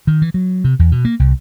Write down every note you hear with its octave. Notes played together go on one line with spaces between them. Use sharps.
D#3
E3
F#3
C3
E2
B2
A#3
C2